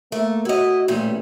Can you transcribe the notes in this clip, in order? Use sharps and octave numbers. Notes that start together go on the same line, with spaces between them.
A3 A#3
E4 F#4 D#5
A1 A#2 G3 A3